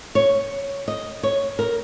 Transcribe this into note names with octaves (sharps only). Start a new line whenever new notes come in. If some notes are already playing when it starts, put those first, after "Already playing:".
C#5
D#5
C#5
A#4